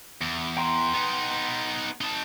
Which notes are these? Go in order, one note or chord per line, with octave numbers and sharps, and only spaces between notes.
E2
G5 A#5 C6
B3 D#4
D#4 A5